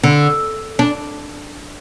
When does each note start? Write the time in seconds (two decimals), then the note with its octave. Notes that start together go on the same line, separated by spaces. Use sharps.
0.03 D3
0.79 D4